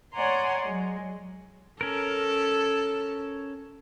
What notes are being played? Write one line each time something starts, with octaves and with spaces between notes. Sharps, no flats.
C#5 D5 F#5 G#5 A#5 C6
F#3 G#3
C#4 A4 A#4